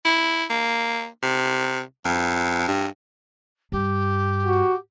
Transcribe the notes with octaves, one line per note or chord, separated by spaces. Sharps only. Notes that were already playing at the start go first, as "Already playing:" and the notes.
E4
A#3
C3
F2
G2
G2 G4
F#4